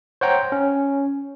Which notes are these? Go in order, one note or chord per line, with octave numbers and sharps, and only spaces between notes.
C5 C#5 F#5 G5 A#5
C#4